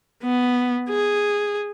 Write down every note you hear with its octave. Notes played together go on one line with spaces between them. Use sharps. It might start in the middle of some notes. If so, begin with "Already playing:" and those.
B3
G#4